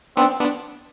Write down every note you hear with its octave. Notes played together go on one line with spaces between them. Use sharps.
B3 C4 D4
B3 D4